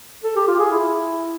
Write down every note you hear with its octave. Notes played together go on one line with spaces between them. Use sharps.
A4
G4
F4
G#4
E4